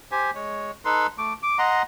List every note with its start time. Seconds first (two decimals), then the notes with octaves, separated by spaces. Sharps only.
0.11 G4 C5 G#5
0.35 G#3 C#5
0.85 D#4 A4 B4 C6
1.18 A3 D6
1.43 D6
1.59 D#5 F#5 A#5 C6